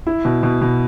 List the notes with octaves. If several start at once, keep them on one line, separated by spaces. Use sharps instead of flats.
E4
B2
B2
B2